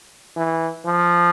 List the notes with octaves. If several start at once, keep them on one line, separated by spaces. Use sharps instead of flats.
E3
F3